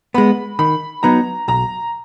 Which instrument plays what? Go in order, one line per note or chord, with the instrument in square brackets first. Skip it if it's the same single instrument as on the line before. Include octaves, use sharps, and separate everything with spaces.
[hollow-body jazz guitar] G#3 B3 [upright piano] B5
[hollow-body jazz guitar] D#3 [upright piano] B5
[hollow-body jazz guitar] F#3 B3 D#4 [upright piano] A#5
[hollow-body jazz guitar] B1 [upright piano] A#5